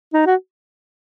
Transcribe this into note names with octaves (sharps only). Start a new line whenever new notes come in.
D#4
F#4